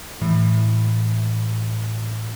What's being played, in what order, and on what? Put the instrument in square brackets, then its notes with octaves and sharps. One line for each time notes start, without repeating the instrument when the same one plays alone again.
[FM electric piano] A2 E3